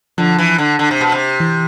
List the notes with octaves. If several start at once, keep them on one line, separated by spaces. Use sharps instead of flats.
D3 F3
E3
D3
D3
C3
B2
C3
E3